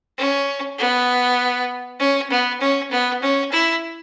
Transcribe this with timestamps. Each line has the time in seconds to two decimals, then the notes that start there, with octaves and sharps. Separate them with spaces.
0.18 C#4
0.78 B3
1.99 C#4
2.30 B3
2.60 C#4
2.91 B3
3.22 C#4
3.52 E4